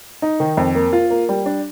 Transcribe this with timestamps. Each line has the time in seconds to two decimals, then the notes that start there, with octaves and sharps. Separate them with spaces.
0.22 D#4
0.40 D#3
0.57 F2
0.75 A#3
0.93 F4
1.10 A#3
1.29 G3
1.46 D4